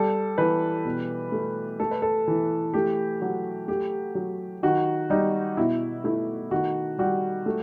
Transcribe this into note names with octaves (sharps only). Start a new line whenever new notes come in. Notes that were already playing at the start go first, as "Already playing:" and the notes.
Already playing: G3 A4
E3 B4
B2
A3
A3 A4
B4
A4
E3
A3 G4
F#3 F#4
A3 G4
F#3
D#3 F#4
G3 D#4
B2 E4
A3 E4
D#3 F#4
G3 F#4
A3